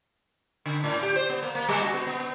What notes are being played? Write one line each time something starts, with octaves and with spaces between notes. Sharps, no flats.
D3
A2
G4
C5
B3
A#3
A#3
G3
F#4
B3
B3
B3